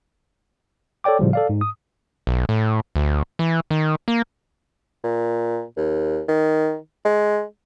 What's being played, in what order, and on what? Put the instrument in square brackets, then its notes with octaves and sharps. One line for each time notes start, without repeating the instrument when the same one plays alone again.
[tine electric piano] A4 C#5 D5 G5 D6
A2 C#3 F3 G3
A4 D5 F5
G#2
D#6
[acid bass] B1
A2
D2
E3
D#3
A#3
[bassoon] A#2
D#2
D#3
G#3